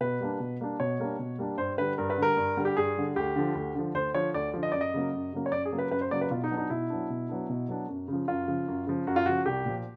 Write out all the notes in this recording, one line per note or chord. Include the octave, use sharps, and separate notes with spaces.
B2 B4
G3 A#3 D4
B2
G3 A#3 D4
B2 C#5
G3 A#3 D4
B2
G3 A#3 D4
G2 C5
D3 G3 B4
G2 A#4
B4
D3 G3 A#4
G2
D3 G3
G4
G2 G#4
D3 G3
D2 G4
D3 F3
D2
D3 F3
D2 C5
D3 F3 C#5
D2 D5
D3 F3
D#5
F#2 D5
D#5
C#3 F#3 A#3
F#2
C#3 F#3 A#3
C#5
F#2 D5
G#4
C#3 F#3 A#3
B4
F#2 B4
C5
C#3 F#3 A#3 D5
B4
B2 F4
D#4
F#3 B3 D4
D#4
B2 E4
F#3 B3 D4
B2
F#3 B3 D4
B2
F#3 B3 D4
F#2
C#3 F3
F#2 F4
C#3 F3
F#2
C#3 F3
F#2 F#4
F4
C#3 F3 F#4
C2 G4
A#2 F3